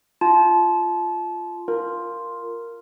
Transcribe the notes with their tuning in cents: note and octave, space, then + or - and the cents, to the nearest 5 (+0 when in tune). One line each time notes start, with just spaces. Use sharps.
F4 -5 A5 -30
F4 +0 A#4 -5